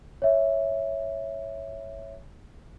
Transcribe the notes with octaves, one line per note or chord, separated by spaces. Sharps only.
C#5 E5